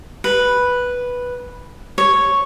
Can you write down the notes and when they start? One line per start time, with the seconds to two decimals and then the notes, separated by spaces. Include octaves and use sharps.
0.24 B4
1.98 C#5